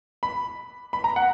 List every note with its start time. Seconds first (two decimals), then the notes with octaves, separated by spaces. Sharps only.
0.23 B5
0.93 B5
1.04 A#5
1.16 F#5